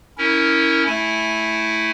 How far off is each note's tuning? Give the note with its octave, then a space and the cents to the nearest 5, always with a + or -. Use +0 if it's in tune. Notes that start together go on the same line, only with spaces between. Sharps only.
C#4 +10 E4 -20 A#4 -10
A3 -5 E4 +0 G#5 +5